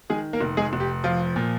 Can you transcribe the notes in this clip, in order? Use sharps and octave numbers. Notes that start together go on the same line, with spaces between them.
D#3 G#3 G#4
A#3 A#4
F1
G#3 G#4
F1
G4
F3 F4
A#2